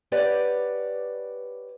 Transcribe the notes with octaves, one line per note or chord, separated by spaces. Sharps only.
G4 B4 C#5 D5 F#5